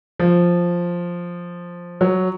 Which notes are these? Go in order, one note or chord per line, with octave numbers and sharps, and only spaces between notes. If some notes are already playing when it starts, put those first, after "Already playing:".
F3
F#3